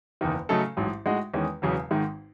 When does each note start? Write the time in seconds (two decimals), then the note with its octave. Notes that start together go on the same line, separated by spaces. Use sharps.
0.21 F#1 E2 D#3
0.49 C#3 F#3 A3 D#4 A4
0.77 A1 G#2 F#3
1.06 A2 G#3 D#4 F#4
1.34 E2 D#3 G#3 C#4
1.62 E1 E2 C#3 F#3
1.91 G#1 G#2 D#3 G#3